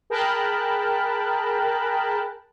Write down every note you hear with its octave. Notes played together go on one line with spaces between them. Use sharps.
G#4 A#4 G5 A5 B5 F#6